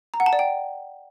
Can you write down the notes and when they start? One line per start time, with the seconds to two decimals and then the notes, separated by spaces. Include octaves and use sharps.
0.14 A#5
0.20 F#5
0.26 A5
0.33 D5
0.39 G5